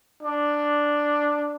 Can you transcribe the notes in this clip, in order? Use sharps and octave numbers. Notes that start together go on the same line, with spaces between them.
D4